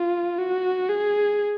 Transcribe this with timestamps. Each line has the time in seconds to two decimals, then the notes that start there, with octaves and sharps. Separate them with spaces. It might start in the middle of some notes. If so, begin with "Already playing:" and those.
Already playing: F4
0.39 F#4
0.89 G#4